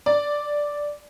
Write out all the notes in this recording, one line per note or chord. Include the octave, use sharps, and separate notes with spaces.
D5